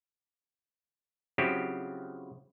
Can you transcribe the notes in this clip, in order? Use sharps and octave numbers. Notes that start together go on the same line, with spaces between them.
C#3 F3 F#3 C4 E4 G4